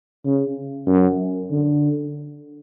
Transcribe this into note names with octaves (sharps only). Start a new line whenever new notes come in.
C#3
F#2
D3